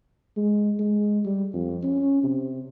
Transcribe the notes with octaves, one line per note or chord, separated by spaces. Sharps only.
G#3
G#3
G3
F2
C#4
C3